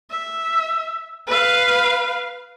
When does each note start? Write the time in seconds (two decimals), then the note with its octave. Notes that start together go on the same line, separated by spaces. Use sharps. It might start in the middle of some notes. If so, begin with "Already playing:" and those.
0.10 E5
1.28 B4 F5